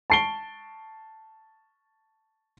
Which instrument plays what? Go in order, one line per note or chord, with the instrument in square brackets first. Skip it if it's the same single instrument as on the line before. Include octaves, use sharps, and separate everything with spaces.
[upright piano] A5 C#6 C7 D7 G7